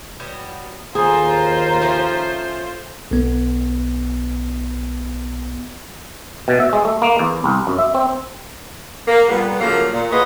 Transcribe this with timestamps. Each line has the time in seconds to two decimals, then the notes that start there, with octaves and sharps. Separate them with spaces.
0.20 F#3 G3 B3
0.95 D#2 F4 G#4 A4 C5 G#5 A#5
1.82 F3 A3 C#4
3.11 B1 B3
6.48 B2
6.60 E5
6.73 G#3
6.85 A3
7.02 A#3
7.19 E2
7.44 C2
7.67 F#2
7.78 E5
7.95 C4
9.08 A#3
9.28 F2 A#2 G3 B3
9.60 C#3 F3 F#3 A3 A#3
9.93 A#2
10.11 F4 F#4 G#4 B4 C#5 D#5